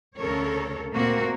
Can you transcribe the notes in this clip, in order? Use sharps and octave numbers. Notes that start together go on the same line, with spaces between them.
D2 C#3 A4 A#4 C#5
A#2 A3 A#3 C4 F#4 A#4